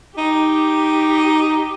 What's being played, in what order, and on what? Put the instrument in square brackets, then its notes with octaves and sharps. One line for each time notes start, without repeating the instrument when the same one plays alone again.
[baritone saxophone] D#4 [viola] G4